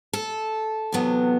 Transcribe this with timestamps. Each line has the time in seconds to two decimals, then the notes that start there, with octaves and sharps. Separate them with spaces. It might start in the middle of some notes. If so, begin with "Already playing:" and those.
0.13 A4
0.92 E2 C3 F#3 B3